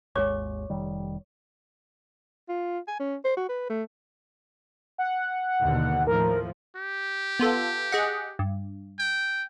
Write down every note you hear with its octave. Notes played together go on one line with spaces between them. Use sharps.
G#1 D#2 G#3 C#5 C#6 D6
F1 D#3 G3
F4
G#5
C#4
C5
F#4
B4
A3
F#5
D#2 B2 D3
A2 F3 A#4
G4
B3 F4 A4
G#4 D#5 F#5
G2
G5